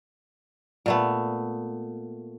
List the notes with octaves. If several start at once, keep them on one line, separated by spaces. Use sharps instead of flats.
A#2 A3 B3